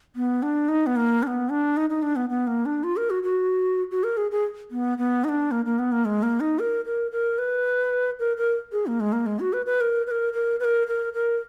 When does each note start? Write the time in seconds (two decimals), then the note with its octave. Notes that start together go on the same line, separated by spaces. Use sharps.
0.16 B3
0.43 D4
0.69 D#4
0.87 B3
0.96 A#3
1.23 D4
1.27 B3
1.50 D4
1.77 D#4
1.90 D#4
2.03 D4
2.16 B3
2.30 B3
2.47 A#3
2.66 D4
2.84 F4
2.97 A#4
3.10 F#4
3.23 F#4
3.91 F#4
4.04 A#4
4.17 G#4
4.31 G#4
4.71 B3
4.98 B3
5.24 D#4
5.29 D4
5.51 A#3
5.65 A#3
5.79 B3
5.92 A#3
6.05 G#3
6.23 A#3
6.40 D#4
6.59 A#4
6.85 A#4
7.12 A#4
7.38 B4
8.19 A#4
8.37 A#4
8.72 G#4
8.87 A#3
9.00 G#3
9.12 A#3
9.26 G#3
9.40 F#4
9.53 B4
9.66 B4
9.81 A#4
10.07 B4
10.11 A#4
10.33 A#4
10.60 B4
10.64 A#4
10.87 A#4
11.13 A#4